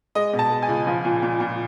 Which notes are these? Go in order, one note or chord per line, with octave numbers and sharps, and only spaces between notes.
G#3 D#5
B2
A5
G#3
G#5
C#2
F3
A#2
A#2
A#2